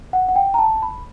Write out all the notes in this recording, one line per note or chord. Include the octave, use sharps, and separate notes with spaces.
F#5
F#5
G5
A#5
A5
B5